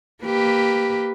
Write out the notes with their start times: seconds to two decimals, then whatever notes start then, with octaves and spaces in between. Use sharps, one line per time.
0.24 A#3 G4 B4